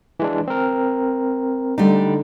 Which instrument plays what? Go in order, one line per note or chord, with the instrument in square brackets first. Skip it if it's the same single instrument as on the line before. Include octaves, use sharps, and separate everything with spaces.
[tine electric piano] E3 G#3 D4
C4 A#4
[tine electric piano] D3 D#4 [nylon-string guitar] G3 A3 D4